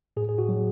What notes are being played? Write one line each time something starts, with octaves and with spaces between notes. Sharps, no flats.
A2 G#4
G#4
F#4
F#3